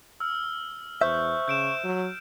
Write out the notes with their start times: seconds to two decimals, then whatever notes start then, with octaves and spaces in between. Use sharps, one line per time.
0.20 E6 F6
1.01 E2 C5 E5 C#6 G6
1.48 C#3 G6 D7 E7
1.84 F#3